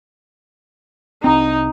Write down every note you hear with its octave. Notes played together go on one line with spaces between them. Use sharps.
C2 C4 D#4